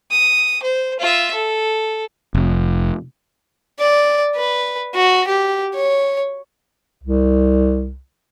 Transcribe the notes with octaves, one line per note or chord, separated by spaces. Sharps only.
D#6
C5
F4 E5
A4
F1
D5
B4
F#4
G4
C#5
C2